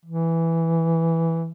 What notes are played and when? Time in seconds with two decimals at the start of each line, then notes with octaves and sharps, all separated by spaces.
0.06 E3